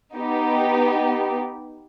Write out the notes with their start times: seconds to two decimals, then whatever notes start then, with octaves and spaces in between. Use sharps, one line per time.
0.15 B3 D#4 G4